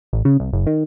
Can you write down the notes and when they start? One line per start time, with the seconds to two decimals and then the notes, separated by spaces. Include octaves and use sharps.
0.13 A1
0.25 C#3
0.40 C2
0.53 F#1
0.67 D#3